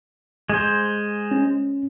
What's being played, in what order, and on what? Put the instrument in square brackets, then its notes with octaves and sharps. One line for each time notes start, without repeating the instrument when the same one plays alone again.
[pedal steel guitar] G#3 C5
[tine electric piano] C#4